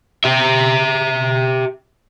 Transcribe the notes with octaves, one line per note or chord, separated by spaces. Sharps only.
G4 E5